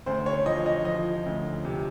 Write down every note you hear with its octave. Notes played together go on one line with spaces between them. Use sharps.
D2 C5
C#5
F3 D#5
D#5
F3 D#5
D2
C3